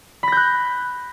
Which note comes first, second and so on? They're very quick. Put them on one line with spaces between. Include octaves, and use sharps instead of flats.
B5 A#6 G6 F#6